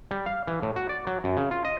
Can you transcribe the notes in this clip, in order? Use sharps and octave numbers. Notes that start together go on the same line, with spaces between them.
G3
F5
E3
A2
F#4
D5
F#3
F#2
C#3
F4
D#5